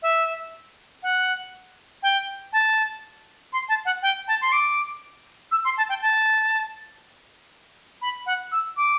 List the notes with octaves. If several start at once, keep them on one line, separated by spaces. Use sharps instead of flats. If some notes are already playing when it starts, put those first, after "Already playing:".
E5
F#5
G5
A5
C6
A5
F#5
G5
A5
C6
D6
E6
C6
A5
G5
A5
B5
F#5
E6
D6